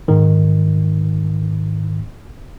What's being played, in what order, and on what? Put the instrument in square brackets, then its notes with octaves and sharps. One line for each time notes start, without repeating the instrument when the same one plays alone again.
[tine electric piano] G#2 D#3